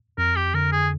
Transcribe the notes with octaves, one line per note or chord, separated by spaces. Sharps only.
F2 A#4
G4
D3 A#4
G#4